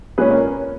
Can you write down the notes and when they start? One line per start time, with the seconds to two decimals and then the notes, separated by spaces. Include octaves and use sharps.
0.18 A#2 G#3 C#4 G#4 B4
0.31 A#4 C#5